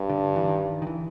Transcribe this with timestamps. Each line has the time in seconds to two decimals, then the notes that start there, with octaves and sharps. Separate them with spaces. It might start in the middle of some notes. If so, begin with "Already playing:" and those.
Already playing: G2
0.10 D3
0.36 E3
0.47 D#3
0.82 D#3
0.87 E3